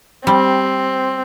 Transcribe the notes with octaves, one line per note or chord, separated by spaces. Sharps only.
G3 C4